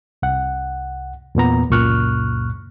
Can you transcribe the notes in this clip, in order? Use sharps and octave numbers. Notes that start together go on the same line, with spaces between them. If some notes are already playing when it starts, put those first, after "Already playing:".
C2 F#5
E2 A#2 B3 A#5
C#2 F#2 A#2 C#6 F6 F#6